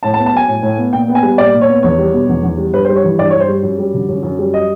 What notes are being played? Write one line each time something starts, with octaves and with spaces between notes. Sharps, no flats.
A2 A5
A5
B3
A5
F#3 G#5
A2
A2
B3
A#2 G5
B3
G#5
G3
A#2 D5
A#2
C#5
B3
E2 C#5
G3
B2
E2
E2
G3
G2 B4
C5
G3
C#5
E3
G2 D5
C#5
G2
C5
G3
F#2
G3
D3
F#2
F#2
G3
D#5